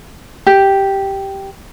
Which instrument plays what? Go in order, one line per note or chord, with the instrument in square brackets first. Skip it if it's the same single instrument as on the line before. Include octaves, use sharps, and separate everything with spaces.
[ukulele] G4